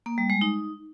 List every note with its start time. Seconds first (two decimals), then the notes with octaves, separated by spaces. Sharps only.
0.06 A#3
0.18 G3
0.30 G#3
0.41 D#4